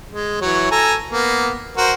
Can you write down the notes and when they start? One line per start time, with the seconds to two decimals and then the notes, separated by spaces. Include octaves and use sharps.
0.11 G#3
0.41 E3 F#3 C#5
0.71 A4 G#5 A#5
1.11 A#3 B3
1.77 F#4 A#4 C5